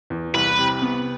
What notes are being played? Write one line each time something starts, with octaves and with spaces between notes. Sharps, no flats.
E2
C2 B4
C3
B3